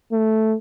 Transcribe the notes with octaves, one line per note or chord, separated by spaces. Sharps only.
A3